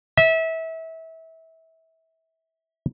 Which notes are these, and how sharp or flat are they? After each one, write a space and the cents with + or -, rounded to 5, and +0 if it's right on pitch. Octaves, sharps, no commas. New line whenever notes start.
E5 -25